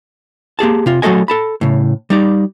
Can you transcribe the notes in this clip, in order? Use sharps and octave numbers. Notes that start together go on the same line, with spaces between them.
A#3 G4 G#4 A5
C3 F4
F#3 A3 F#4 A4 D#5 G#5
A4 A5 B5
A2 C#3
G3 D#4 D5